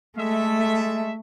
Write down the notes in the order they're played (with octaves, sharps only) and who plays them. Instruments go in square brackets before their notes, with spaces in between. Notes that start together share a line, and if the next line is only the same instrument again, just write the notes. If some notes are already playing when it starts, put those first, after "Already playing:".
[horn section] G#3 A4 E5 [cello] A3